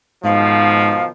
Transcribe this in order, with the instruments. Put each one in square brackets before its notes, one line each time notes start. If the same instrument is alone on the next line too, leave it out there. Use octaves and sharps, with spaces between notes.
[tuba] G#2 [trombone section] B2 D#3 F3 [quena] F5